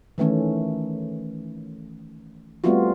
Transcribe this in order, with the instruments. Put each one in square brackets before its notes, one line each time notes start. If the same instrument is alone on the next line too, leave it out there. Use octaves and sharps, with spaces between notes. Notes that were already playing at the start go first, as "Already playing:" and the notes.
[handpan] D#3 E3 A3 C#4
G3 A3 B3 C4 F4 F#4